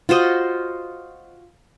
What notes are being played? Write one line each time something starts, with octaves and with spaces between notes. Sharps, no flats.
F4 F#4 C5 D#5